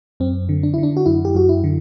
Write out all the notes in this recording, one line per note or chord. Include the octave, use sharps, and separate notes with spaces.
F#2 C4
D3
D4
D3 E4
D4
F#4
F#2 E4
G4
F#2 F#4
E4
D3